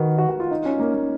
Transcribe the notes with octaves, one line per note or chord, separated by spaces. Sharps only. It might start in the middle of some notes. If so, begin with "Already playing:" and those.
Already playing: D#3 F#4 A#4 B4
F#4
F#4
F4
D#4
C#4
A#3
A#3